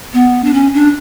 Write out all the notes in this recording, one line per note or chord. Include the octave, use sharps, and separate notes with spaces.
B3
D4
C#4
D4